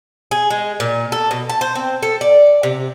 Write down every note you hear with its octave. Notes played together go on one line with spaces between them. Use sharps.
G#4
G#3
A#2
A4
B2
A5
C5
C4
A4
D5
C3